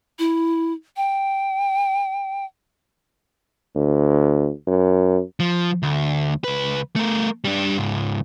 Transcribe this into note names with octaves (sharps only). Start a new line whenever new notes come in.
E4
G5
D2
F#2
F3
D2
C#2 B4
A3 A#4
G3 D4
C#2 G#2